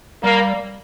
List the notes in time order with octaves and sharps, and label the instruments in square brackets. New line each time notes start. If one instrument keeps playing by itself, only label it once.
[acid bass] G3 [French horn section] A#3